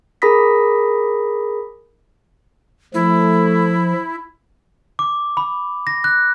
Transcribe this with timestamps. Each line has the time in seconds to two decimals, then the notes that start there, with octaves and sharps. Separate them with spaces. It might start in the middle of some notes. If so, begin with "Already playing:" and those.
0.22 G#4 A#4 B5 D#6 A#6 B6
2.94 F3 A3 E4
4.99 D6
5.37 B5
5.87 A#6
6.04 F#6